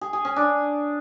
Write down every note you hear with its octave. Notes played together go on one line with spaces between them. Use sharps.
G#4
G#4
C#4
D4